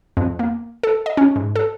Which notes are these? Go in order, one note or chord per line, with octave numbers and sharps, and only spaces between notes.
F2
A#3
A4
D#5
C#4
G#2
A4